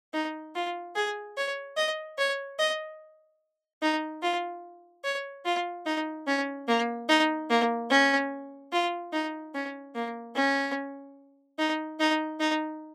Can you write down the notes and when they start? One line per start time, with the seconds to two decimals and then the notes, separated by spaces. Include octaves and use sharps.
0.14 D#4
0.55 F4
0.95 G#4
1.37 C#5
1.77 D#5
2.18 C#5
2.59 D#5
3.82 D#4
4.22 F4
5.04 C#5
5.45 F4
5.86 D#4
6.27 C#4
6.68 A#3
7.09 D#4
7.50 A#3
7.90 C#4
8.73 F4
9.13 D#4
9.55 C#4
9.95 A#3
10.36 C#4
11.59 D#4
12.00 D#4
12.40 D#4